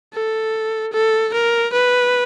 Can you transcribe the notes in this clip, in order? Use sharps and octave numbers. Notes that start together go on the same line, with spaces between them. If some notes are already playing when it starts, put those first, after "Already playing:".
A4
A4
A#4
B4